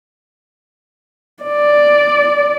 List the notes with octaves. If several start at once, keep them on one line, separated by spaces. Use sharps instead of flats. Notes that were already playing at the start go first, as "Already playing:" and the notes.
D5